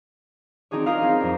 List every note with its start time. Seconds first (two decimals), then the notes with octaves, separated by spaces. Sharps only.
0.71 C4 D4 D#4 F#4 G#4 C#5
0.86 F4 G#4 A#4 C5 D#5 F5
1.02 C4 C#4 D#4
1.20 F2 D4